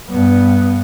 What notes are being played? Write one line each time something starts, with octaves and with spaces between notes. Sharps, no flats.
G2 B3